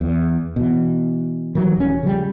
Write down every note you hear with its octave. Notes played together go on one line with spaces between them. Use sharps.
E2
B2 E3
D#3 E3 F#3 G3
E1 C#4
C#3 F3 G3